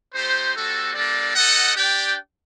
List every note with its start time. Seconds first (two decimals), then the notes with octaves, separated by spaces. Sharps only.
0.13 A3 D#4 G4 C5
0.55 G3 C4 F#4 A4
0.94 G3 A#3 D4 A4 D5
1.36 D#4 A4 D#5 F#5
1.75 D4 G4 D5 G5